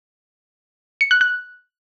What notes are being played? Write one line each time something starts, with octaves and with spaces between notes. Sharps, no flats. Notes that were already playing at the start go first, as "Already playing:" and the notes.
C#7
F#6
F#6